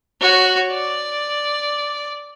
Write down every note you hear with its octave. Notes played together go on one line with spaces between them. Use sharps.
F#4 C#5
D5